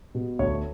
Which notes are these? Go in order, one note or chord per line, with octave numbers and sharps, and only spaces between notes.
B2
D2 C#5